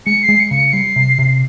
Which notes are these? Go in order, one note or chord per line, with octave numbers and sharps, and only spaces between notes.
G#3 C#7
C7
G#3
C#7
C#3
C#7
G3 C7
C3
C3